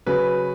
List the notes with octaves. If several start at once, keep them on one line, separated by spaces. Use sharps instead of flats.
C#3 F#3 B4